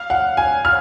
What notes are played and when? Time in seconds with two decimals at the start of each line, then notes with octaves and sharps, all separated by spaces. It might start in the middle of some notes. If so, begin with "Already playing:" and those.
Already playing: F5
0.10 F#5
0.37 G#5
0.65 F6